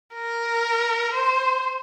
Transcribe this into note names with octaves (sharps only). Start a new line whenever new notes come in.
A#4
C5